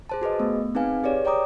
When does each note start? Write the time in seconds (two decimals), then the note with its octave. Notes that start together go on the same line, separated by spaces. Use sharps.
0.09 G#4 C5 A5
0.22 F#4 G#4 B4 D#5
0.40 A3 B3
0.75 C4 D#4 G#4 B4 F5 G#5
1.03 G4 G#4 B4 C#5 D5
1.25 C#5 D5 G5 A#5 D6 D#6